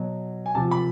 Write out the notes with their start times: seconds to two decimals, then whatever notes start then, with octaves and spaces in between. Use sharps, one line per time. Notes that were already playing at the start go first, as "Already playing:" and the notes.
Already playing: B2 F#3
0.46 G#5
0.55 C3 F3 A5
0.71 B5